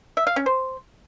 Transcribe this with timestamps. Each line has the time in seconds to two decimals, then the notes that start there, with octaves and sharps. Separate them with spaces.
0.17 E5
0.27 F5
0.36 C#4
0.46 C5